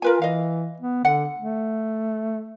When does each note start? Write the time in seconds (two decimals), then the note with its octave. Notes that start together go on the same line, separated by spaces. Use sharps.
0.02 F4 A#4 B4 G#5
0.22 E3 D#5 F5
0.81 B3
1.05 D3 F#5
1.39 A3